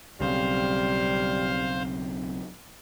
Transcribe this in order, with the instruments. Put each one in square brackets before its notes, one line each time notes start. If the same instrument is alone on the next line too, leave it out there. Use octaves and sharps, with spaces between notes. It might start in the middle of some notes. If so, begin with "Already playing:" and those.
[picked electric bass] B1 C#3 [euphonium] G3 [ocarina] C4 [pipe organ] C5 F5